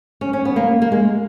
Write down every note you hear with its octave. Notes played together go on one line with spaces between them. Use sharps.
C#4
C#4
B3
A#3
A#3
G#3